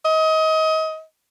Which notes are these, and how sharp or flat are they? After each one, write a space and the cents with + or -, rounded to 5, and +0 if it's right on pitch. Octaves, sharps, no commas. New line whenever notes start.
D#5 +30